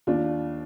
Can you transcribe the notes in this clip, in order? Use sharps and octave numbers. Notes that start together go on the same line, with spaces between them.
D#2 D4 F4